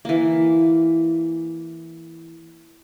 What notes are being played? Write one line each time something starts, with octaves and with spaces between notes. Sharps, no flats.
E3 A#3